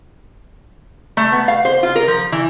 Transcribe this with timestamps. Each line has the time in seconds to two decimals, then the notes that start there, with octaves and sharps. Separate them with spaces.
1.17 A3
1.32 B3
1.48 F5
1.65 C5
1.83 F4
1.96 A#4
2.08 F3
2.32 E3